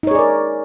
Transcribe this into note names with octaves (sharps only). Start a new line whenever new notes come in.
D#4 G#4 A#4 C#5 D5